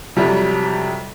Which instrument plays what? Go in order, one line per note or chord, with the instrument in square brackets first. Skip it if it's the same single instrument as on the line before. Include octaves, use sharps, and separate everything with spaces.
[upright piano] F2 C3 F#3 G3